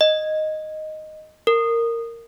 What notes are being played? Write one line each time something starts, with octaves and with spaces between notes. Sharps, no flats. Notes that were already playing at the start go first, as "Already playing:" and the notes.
D#5
A#4